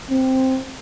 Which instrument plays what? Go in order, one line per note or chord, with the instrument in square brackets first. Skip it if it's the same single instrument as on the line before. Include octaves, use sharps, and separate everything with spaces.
[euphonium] C4